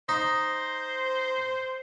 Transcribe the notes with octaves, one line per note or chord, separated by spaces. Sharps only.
D#4 C5